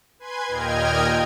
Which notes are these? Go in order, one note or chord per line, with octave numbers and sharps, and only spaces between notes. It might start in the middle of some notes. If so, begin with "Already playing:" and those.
B4 G#5 C6 G#6
D#2 A#2 D#5 G5 F6 G#6